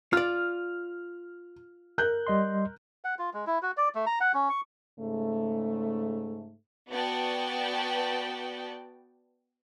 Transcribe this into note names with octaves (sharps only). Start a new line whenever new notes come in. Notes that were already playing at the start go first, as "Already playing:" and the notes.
F4 D5 F6
A#4 F#6 G6
G3 D#5 C6
F#5
F4
G#3
E4
F#4
D5
A3
A#5
F#5
C#4
C#6
G#2 C#3 A3
B3 F#4 D5 G5 A5